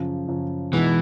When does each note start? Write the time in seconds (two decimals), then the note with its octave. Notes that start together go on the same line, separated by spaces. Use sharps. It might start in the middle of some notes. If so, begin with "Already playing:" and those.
Already playing: F#2 C#3 F3
0.28 F#2 C#3 F3
0.73 B2 E3 G#3 B3 D#4